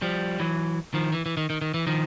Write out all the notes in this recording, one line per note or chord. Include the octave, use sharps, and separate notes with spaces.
F3 G3
E3 F#3
D#3 F3
E3
E3
D#3
D#3
D#3
E3
D#3 F3